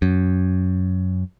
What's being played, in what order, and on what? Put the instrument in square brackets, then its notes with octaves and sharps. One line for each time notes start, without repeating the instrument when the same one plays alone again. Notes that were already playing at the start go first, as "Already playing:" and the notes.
[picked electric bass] F#2